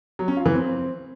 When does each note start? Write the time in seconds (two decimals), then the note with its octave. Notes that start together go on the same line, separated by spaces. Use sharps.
0.19 F#3
0.28 C#4
0.37 F4
0.46 E3
0.54 C4